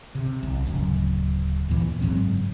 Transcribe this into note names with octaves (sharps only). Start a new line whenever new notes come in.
C3
C2
D1 C#2 F#2
D#2 A#2 E3
F#1 G#2 F#3 C4